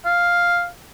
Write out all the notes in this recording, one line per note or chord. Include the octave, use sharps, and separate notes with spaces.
F5